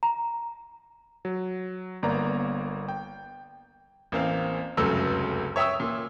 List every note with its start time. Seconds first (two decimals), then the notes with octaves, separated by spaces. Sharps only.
0.03 A#5
1.25 F#3
2.03 G1 A#3 B3 D5 A#5
2.89 G5
4.12 A1 A#3 C4 F5
4.77 F1 C#2 F#2 F#3 A3 E6
5.56 C#5 E5 G5 D#6 E6
5.80 A#2